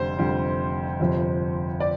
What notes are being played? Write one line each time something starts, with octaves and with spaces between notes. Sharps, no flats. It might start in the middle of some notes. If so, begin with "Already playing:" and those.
Already playing: F1 F2 D3 G3 C5
F1 F2 D3 G3
G1 F2 C3 F3
D5